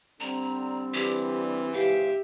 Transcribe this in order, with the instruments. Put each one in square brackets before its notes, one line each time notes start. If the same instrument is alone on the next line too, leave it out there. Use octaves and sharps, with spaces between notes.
[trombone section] D3 G3 C4 [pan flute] A#5
[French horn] E3 [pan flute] G4
[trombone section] E2 G#2 C#3 [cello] G4 E5 [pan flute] F5